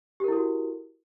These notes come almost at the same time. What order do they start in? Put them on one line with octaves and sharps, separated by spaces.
G4 A#4 E4 A4 F#4